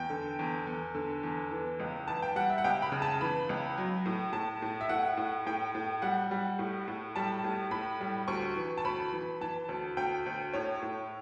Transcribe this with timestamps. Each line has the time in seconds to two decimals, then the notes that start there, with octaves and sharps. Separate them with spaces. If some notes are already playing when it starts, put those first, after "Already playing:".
Already playing: E2 G5
0.10 D3
0.39 E2
0.67 E2
0.95 D3
1.23 E2
1.51 E3
1.80 C#2
2.08 E3 A5
2.22 G5
2.36 G3 F#5
2.50 E5
2.58 F#5
2.64 C#2 G5
2.82 B5
2.92 C#3
3.02 A5
3.21 E3 B5
3.49 C#2
3.78 F#3
4.06 A2
4.33 A2 A5
4.62 A2
4.81 E5
4.89 A2 F#5
5.17 A2
5.46 A2 G5
5.75 A2
6.02 G3 F#5
6.31 G3
6.59 A2
6.88 A2
7.16 G3 A5
7.44 A2
7.71 A2 B5
8.01 G3
8.28 D2 C#6
8.56 E3
8.78 A5
8.84 D2 B5
9.12 E3
9.41 E3 A5
9.69 D2
9.97 D2 G5
10.26 D2
10.53 A2 C#5
10.82 A2